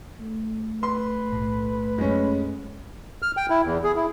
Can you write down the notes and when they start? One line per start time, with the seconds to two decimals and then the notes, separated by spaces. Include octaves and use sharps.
0.20 A3
0.83 B4 C6
1.32 B1 A2
1.98 F#2 G#3 C#4
3.22 F6
3.37 G5
3.50 E4
3.65 E2
3.84 G#4
3.96 E4